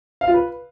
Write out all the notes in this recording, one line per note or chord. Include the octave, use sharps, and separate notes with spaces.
F5
F4
B4